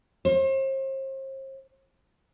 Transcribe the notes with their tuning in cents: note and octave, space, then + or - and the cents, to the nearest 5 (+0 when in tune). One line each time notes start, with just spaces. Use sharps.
C5 +40